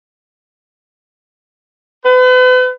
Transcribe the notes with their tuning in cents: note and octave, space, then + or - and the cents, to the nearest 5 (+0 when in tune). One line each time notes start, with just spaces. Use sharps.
B4 +40